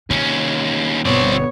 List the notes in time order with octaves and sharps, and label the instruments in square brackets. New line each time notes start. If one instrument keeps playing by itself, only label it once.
[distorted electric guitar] D#2 C#4 [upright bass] C3
[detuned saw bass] G1 [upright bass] B2 D3 [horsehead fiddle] B3 C#5 [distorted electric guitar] C4 D5